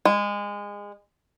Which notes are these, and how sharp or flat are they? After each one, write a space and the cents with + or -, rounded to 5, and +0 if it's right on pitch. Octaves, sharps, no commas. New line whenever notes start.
G#3 -25